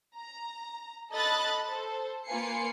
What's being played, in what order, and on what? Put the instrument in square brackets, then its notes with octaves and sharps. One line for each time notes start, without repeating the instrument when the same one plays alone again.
[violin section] A#5
A4 D#5 B5 F#6 A6
A4 C5
A#3 F4 B4 G#5 C7 C#7